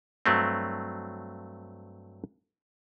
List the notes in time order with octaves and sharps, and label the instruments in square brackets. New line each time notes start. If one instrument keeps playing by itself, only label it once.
[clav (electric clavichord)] G2 F#3 A3 C4